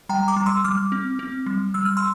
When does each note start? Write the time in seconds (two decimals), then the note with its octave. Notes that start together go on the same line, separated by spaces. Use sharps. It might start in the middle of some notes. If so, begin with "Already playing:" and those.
0.09 G3 G5 A#5
0.28 A#5 D6
0.36 G3
0.46 C6 E6
0.64 G3 D6 F6
0.92 C4
1.19 C4
1.46 G3
1.74 G3 E6
1.85 F6
1.97 C6 E6